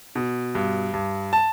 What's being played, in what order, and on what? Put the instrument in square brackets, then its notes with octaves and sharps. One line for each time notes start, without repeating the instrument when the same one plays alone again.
[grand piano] B2
G2
G2
A5